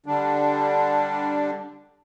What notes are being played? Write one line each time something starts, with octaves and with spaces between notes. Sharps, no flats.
D3 G3 D4